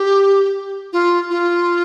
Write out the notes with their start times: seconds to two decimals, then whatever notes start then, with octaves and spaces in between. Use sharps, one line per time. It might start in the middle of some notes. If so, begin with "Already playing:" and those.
Already playing: G4
0.93 F4
1.30 F4